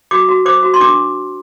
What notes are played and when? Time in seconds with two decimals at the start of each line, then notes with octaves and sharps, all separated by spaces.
0.11 F#4 D6
0.29 F#4
0.45 C5 D6
0.63 F#4
0.74 C6
0.80 D4 D6